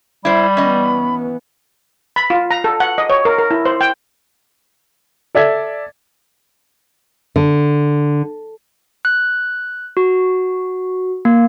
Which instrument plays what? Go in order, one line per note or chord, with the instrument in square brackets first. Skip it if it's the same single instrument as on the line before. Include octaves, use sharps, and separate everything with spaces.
[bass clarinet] G3 [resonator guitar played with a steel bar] E4 C5 [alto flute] B5
[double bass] E3 B3 [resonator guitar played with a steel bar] C#4 D#5
[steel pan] B5
F4
A#5
A4
F#5
D#5
C#5
A#4
A#4
E4
C5
G5
[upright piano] A4 D5 E5 G#6
[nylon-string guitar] D3
[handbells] F#6
F#4
A#3